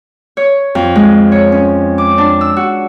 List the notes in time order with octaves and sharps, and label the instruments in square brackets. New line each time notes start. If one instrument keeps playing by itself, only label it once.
[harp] C#5
F2
G#3
C#5
C#4
D6
D4
E6
F#4